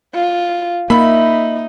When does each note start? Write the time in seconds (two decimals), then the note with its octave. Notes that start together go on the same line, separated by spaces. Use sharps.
0.14 F4
0.90 A#3 D#4 E5 B5